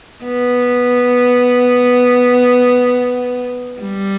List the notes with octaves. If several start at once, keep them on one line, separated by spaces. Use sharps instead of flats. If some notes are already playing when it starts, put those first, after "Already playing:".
B3
G3